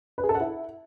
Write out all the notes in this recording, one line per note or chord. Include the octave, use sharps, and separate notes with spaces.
B4
G#4
A4
F#5
E4